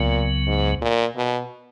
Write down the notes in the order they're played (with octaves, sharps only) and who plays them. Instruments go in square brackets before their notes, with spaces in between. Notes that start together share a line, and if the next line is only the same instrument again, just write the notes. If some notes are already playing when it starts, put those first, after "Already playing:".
Already playing: [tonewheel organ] C#2 C#3 F#3 B3 [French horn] A#2
[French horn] G#2
A#2
B2